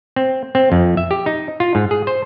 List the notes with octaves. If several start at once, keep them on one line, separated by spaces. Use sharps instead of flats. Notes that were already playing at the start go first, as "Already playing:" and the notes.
C4
C4
F2
E5
G4
D#4
F4
G#2
G#4
C5